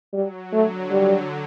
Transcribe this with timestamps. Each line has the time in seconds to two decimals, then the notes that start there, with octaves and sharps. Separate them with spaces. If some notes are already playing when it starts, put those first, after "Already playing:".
0.13 F#3 G3
0.52 D3 A3
0.91 G3